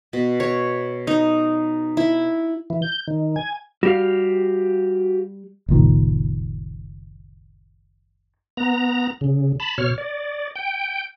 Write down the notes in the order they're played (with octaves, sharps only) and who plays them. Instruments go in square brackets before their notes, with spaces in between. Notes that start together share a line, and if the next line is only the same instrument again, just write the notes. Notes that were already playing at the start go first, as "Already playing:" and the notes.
[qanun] B2
C#5
D#4
E4
[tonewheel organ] E3
G6
D#3
G#5
[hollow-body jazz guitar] G3 [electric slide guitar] F#4 G4 F5
[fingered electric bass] F#1 C#2 A#2 D#3
[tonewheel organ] B3 A#5
C#3
A5 B5
B2 C#5 F6
D5
G5